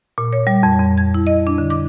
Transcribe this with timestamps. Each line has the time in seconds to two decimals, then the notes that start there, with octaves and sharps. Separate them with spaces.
0.18 A#2
0.33 C#5
0.47 G3
0.63 F2
0.80 F2
0.98 G#6
1.14 E4
1.27 D#5
1.47 D4
1.58 D3
1.70 D6